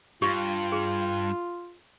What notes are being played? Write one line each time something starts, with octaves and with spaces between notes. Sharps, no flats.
G2 F4 G4
G#4